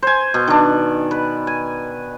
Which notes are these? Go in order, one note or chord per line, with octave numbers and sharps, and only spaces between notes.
C5 G#5
B2
D#3 D4
B4
G#5